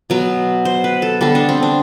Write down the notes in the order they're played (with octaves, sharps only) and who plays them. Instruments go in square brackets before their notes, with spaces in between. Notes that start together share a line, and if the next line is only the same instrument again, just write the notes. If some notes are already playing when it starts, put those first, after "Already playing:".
[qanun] B2 F#3 B3
C5
B4
A4
D3 G3 B3 A4
D4
C4
D4